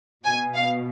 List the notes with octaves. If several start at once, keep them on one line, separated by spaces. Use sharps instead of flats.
B2 G#5
F5